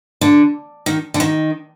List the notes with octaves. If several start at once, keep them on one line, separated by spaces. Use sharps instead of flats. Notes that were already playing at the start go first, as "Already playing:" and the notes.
D3
D#3
D3
D#3